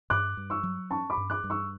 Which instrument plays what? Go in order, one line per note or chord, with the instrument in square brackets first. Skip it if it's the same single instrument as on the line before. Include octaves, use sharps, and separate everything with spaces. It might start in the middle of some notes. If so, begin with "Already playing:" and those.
[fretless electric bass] G2 [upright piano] D6 F#6
[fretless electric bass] G2
[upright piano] C#6 E6
[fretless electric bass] F#3
[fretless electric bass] C#4 [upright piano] A5 C#6
[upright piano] B5 D6
[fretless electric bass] G2
[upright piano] D6 F#6
[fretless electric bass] G2
[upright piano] C#6 E6